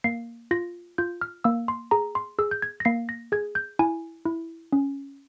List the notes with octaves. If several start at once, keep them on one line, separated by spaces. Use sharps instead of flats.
A#3 C7
F4 A#6
F4 G6
F6
A#3 E6
C6
G#4 A#5
C6
G#4 E6
G6
G#6
A#6
A#3 C7
A#6
G#4 G#6
G6
E4 G#5
E4
C#4